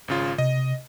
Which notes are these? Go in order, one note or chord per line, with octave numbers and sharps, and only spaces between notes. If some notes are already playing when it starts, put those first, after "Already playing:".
G#1 C#3 F4
C3 D#5